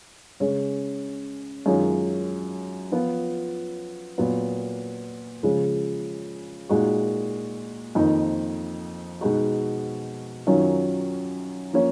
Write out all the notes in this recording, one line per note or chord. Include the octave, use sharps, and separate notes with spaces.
C#3 G#3 C#4
F#2 D#3 G#3 C#4 F4
F3 B3 F4
A#2 F#3 B3
C#3 F3 G#3
A#2 G#3 D#4 F#4
F2 D#3 A#3 D#4
B2 G#3 D#4 F#4
F#2 D#3 F#3 C#4 F4
F3 A#3 C#4